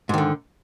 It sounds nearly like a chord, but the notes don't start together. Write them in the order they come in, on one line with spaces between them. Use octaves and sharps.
G#2 D#3 D3